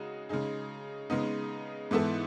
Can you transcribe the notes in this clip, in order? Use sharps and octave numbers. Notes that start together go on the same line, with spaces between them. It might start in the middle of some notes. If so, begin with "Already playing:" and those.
Already playing: C#3 G#3 D#4 F#4
C#3 G#3 D#4 G#4
C#3 G#3 B3 D#4
G#2 E3 B3 E4 A4